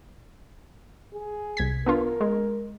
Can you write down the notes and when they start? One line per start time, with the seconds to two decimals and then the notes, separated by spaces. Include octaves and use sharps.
1.14 G#4
1.57 C2 G#6 B6
1.86 B3 D4 F4 A#4
2.21 G#3